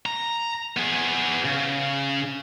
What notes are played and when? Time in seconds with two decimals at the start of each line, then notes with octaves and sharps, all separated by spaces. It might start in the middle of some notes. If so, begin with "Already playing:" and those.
0.06 A#5
0.77 B3 G#4
1.45 C#3